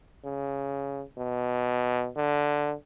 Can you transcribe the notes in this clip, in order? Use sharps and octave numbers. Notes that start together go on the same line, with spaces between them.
C#3
B2
D3